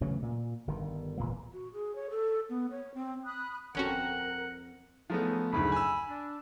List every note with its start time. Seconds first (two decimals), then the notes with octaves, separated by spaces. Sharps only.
0.01 C#3 E3 F#3 A3
0.22 A#2
0.67 G1 G2 D#3
1.18 E1 A#2 E3 A#3
1.53 F#4
1.73 G#4
1.95 C#5
2.10 A4
2.50 B3
2.71 C#5
2.95 C4
3.25 B5 D#6 F#6
3.75 G1 F2 C#4 F#4 A#4 F#5 A#5
5.10 C#2 F3 A3 B3 C#4 D#4
5.52 F#1 D2 G#2 B5
5.72 G#5 E6
6.08 D4